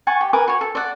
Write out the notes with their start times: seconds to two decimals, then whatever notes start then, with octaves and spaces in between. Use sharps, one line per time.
0.07 F#5 G#5 A5 C#6
0.21 G4
0.33 A#4 B4 G#5 D6
0.48 F#4 C#5
0.61 A4
0.75 D5 F#5